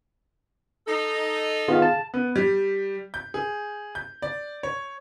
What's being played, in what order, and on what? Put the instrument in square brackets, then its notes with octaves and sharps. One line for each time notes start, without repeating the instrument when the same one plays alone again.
[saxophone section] D#4 A4
[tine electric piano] D#3 B3 F4 [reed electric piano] G#4 F5
[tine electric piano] A5
[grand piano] B3
G3
G6
G#4
G6
D5
C#5